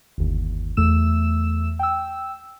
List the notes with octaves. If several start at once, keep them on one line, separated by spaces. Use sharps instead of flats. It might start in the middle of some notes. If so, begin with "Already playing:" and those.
G1 D#2
E2 A3 E6 E7
G5 E6